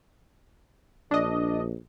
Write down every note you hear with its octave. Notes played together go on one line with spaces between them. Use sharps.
A#1 D4 D#5